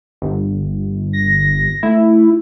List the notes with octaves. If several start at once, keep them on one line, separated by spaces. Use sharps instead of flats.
G1
A#6
A3 E4